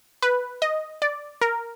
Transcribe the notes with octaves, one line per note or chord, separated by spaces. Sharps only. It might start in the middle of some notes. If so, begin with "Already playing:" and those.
B4
D#5
D5
A#4